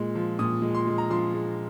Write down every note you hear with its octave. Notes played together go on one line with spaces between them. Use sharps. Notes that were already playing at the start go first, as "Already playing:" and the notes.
Already playing: A#2 G#3
F3
A#2 D#6
G#3
C6
G#3
A#5
F3 C6
G#3